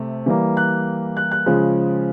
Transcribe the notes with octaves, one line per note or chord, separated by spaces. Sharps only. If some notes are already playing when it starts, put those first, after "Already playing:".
Already playing: C3 A3
E3 G3 A#3
F#6
F#6
F#6
C#3 F3 G#3